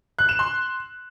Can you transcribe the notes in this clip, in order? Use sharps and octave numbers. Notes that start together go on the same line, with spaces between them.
F#6
E7
C6